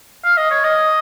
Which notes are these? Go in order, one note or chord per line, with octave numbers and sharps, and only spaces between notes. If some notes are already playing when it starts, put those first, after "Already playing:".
F5
D#5
C#5
D#5